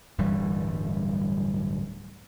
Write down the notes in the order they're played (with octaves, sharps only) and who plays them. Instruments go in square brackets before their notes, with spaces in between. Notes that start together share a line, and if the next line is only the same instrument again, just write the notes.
[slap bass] D1 G2 E3 G3